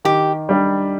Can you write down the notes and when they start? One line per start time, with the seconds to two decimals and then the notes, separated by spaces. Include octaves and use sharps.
0.05 D#3 G4
0.49 G3 D4